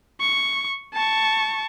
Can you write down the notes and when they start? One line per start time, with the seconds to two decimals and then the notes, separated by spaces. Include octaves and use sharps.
0.20 C#6
0.93 A5 C#6